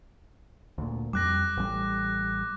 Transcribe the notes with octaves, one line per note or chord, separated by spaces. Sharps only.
D2 A#2
F2 G3 D6 F#6 A#6
A1 G3